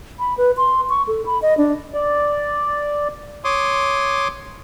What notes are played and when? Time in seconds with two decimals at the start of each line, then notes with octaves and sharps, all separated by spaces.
0.19 B5
0.38 B4
0.57 C6
0.90 C#6
1.08 A4
1.26 B5
1.42 D#5
1.58 D4
1.94 D5
3.44 C#5 C6 D6 D#6